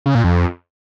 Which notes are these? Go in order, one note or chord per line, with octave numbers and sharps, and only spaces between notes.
C#3
A#2
F2